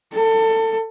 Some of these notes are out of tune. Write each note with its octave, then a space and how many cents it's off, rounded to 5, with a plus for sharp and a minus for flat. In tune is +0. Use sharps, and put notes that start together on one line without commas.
A4 +25